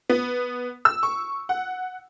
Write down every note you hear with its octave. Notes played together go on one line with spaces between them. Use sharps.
B3
E6
C#6
F#5